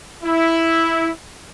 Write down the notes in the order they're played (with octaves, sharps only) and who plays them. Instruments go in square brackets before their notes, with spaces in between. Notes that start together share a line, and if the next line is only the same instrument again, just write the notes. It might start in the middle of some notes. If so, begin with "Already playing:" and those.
[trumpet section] E4